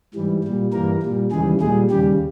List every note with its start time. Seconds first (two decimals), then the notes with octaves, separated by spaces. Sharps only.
0.14 G#2 E3 G3
0.44 A#2 G3
0.73 G2 E3 G3 A#3 A#4
1.03 A#2 G3
1.32 D#2 C#3 E3 G3 G#3 G#4
1.61 A#2 G3 G#3 G#4
1.90 D#2 C#3 G3 G4